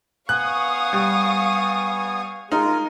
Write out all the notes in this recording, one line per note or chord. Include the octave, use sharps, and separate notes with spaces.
B3 F5 G#5 C#6 D#6 F#6
G3
G#3 D#4 F4 A#4